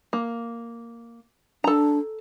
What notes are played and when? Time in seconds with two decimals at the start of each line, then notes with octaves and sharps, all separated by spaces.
0.13 A#3
1.64 D4 A4 A#5